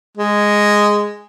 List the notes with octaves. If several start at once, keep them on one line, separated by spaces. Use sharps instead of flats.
G#3